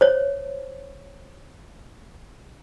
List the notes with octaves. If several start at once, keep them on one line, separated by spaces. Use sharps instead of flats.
C5 C#5